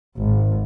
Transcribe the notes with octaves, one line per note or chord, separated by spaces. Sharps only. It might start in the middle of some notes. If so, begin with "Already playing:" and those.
G#1